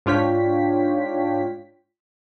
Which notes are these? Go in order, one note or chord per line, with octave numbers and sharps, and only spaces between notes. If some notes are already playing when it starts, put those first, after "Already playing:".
G#2 D4 F4 C#5 G5 B6